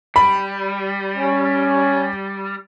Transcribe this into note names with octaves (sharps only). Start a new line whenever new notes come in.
G3 B5
C#4